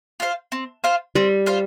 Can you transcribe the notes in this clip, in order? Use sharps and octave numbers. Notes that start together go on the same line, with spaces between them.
F4 C5 F5
C4
F4 C5 F5
G3 C4
F4 C5 F5